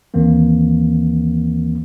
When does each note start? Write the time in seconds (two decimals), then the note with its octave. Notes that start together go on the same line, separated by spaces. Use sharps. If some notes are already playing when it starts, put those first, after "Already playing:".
0.14 D#2 D#3 E3 A#3 C4